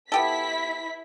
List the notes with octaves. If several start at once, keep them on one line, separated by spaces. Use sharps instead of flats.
B3 E4 G4 A4 B6